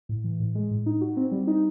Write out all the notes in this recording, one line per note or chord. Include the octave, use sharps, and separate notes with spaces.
A2
E3
A2
G#3
A2
D#4
F#4
C4
G3
D#4